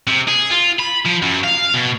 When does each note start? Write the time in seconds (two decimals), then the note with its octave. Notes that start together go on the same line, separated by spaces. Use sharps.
0.07 C3
0.28 G#4
0.51 F4
0.79 B5
1.05 F3
1.22 F#2
1.44 F5
1.74 B2